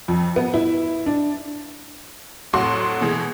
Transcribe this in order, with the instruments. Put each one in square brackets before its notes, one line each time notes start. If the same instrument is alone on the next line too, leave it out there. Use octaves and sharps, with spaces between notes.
[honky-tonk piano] F2
B3
E4
D4
F2 A2 F#3 F#4 C6
B2 E3 G#3